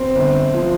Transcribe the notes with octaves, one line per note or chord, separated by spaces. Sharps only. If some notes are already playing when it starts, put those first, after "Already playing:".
Already playing: C4
G1
F3